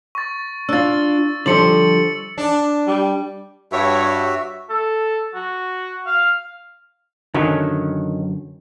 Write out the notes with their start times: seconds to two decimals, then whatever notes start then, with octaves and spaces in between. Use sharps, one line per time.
0.15 C#6 A6
0.69 D4 F4 E6 A6
1.46 D3 F3 G3 A4 C5 C#7 F#7
2.38 D4
2.87 G3
3.72 G2 F#4 C#5 E5
4.70 A4
5.35 F#4
6.07 F5
7.34 F#2 D3 D#3 F#3 C#4